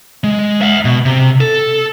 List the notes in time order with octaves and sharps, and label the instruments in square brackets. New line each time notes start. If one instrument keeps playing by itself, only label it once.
[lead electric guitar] G#3
E5 F#5
B2
C3
A4